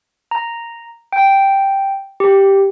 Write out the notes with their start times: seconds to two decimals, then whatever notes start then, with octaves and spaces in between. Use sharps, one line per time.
0.31 A#5
1.13 G5
2.20 G4